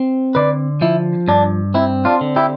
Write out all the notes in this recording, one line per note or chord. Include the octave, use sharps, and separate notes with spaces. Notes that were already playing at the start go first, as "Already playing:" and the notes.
Already playing: C4
D3 B4 D5
F3 E4
G2 D4
C4 E4
D4 F4
D3
E4 G4